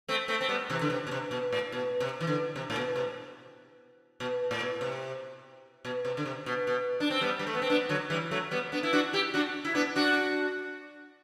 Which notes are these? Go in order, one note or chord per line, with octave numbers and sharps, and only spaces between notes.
A3 C4
A3 C4
C4
G3 B3
C3 E3
D3
C3
B2
C3
B2
A2
B2
C3
E3
D3
C3
A2
B2
C3
B2
A2
B2
C3
B2
C3
D3
C3
B2
B2
D4
C4
G3 B3
G3
A3
B3
C4
B3 D4
D3 F#3
E3 G3
F#3 A3
G3 B3
B3 D4
E4
D4 F#4
E4 G4
D4 F#4
E4
B3 D4
D4 F#4